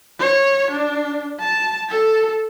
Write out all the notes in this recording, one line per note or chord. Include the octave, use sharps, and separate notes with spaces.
C#5
D4
A5
A4